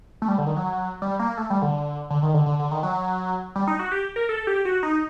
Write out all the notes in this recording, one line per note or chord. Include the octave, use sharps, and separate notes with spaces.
A3
G3
D3
D#3
F#3
G3
A#3
A3
G3
D3
D3
D#3
D3
D3
D3
D#3
F#3
G3
D#4
F#4
G4
A#4
A4
G4
F#4
D#4